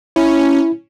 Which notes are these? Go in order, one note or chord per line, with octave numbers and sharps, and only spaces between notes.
C#4 E4